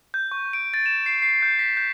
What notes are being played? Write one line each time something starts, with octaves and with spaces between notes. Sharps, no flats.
G6
C#6
D7
A6
E7
C7
C7
G6
B6
G6